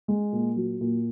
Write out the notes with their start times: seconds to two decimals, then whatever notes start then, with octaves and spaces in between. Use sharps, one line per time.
0.08 G#3
0.32 A#2
0.56 F#3
0.81 A#2